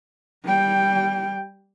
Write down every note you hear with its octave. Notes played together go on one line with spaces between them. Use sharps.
G3 G5